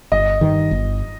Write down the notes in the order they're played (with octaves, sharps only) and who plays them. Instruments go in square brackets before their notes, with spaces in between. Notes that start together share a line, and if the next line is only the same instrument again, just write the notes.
[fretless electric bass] G1 [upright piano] D#5
[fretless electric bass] G2 D#3
G1